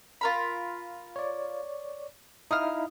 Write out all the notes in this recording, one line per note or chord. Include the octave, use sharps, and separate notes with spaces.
F4 A#4 B5
C#5 D5
D#4 E4 F5 D#6 F6